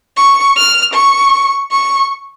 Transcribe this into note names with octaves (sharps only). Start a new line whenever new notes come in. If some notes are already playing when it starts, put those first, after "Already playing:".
C#6
F6
C#6
C#6